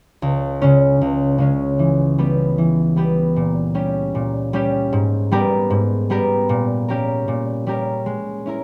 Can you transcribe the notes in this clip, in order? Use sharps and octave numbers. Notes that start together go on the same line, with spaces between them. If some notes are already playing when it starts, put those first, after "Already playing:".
C#2
C#3 G#3 C#4
C#2
C#3 G#3 C#4
E3
G3 B3 G4
E3
G3 B3 G4
A#2
G3 C#4 G4
A#2
G3 C#4 G4
G#2
G3 B3 G4 A#4
G#2
G3 B3 G4 A#4
A#2
G3 C#4 G4 A#4
A#2
G3 C#4 G4 A#4
G#3
C#4 E4 A#4